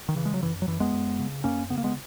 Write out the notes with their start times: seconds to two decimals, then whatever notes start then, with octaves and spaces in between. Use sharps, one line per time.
0.09 D#3
0.16 C#3 E3
0.25 G#3
0.34 F#3
0.42 F#2 E3
0.62 F#3
0.67 F#2 E3
0.80 G#3 B3
0.93 F#2
1.19 C#3
1.44 F#2 A#3 C#4
1.70 C#3 B3
1.78 A#3
1.84 G#3 B3